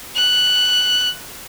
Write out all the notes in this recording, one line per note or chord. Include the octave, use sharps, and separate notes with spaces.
F#6